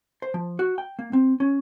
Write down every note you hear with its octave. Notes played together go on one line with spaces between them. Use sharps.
C5
F3
F#4
G5
A#3
C4
C#4